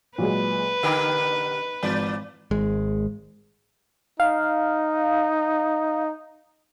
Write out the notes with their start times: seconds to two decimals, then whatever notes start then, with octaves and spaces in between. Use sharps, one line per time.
0.18 A#2 F#3 G#3 B4
0.83 D3 D#4 G4 A#4
1.83 G#1 E3 D5
2.51 G#1 G#3
4.20 D#4 F5